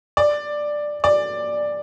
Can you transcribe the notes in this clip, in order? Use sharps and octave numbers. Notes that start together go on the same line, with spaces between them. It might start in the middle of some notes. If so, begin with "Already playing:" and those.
D5
D5